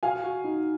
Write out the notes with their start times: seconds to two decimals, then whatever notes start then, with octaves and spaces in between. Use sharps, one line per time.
0.03 F#4 F5 G#5
0.24 F#4
0.45 D#4